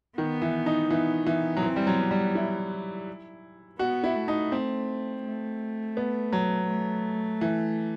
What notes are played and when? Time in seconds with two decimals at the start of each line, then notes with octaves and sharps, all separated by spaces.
0.18 D#3 B3
0.42 E3
0.66 D#4
0.90 E3 B3
1.26 E3 B3
1.57 F#3
1.63 E3 C4
1.76 G3
1.87 F#3
1.99 B3
2.11 G3
2.35 E4
3.79 B3 F#4
4.04 E4
4.15 A3
4.28 D#4
4.52 C4
5.25 A3
5.97 B3
6.32 F#3
6.69 A3
7.41 E3